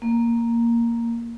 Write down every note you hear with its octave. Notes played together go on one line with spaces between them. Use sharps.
A#3